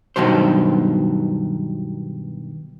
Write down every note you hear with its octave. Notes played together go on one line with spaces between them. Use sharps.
G2 B2 D#3 F#3 C5